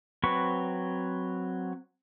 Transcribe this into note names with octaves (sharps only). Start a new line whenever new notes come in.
F#3 C4 B4 C#6